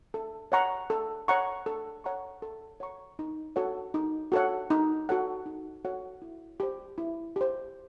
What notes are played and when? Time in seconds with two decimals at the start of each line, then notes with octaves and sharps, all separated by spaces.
0.14 A4
0.52 C#5 F#5 A#5 C#6
0.90 A4
1.28 C#5 F#5 A#5 C#6
1.66 A4
2.04 C#5 F#5 A#5 C#6
2.42 A4
2.80 C#5 F#5 A#5 C#6
3.19 D#4
3.56 F#4 A4 C#5 F#5
3.94 D#4
4.32 F#4 A4 C#5 F#5
4.70 D#4
5.09 F#4 A4 C#5 F#5
5.46 D#4
5.85 F#4 A4 C#5 F#5
6.22 E4
6.60 G4 C5
6.98 E4
7.36 G4 C5